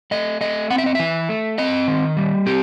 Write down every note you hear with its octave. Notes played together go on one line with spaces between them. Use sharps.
A3 D#5
A3 D#5
C4 F#5
E5
D#5
E3 E5
A3
C4 D#5
D#3
G3
C4 G4